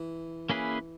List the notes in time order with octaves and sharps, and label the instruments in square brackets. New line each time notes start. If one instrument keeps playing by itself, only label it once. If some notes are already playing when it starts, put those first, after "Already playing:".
Already playing: [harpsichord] E3
[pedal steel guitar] A#3 C#4 E4 G#4 B4